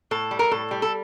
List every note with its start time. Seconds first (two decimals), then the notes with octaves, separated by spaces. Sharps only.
0.11 A2 A4
0.31 G3
0.39 A#4
0.51 A2 A4
0.71 G3
0.82 A4